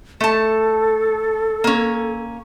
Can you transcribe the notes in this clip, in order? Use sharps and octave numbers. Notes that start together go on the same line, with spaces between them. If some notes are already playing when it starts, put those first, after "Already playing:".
A3 A4 A5
A#3 C#4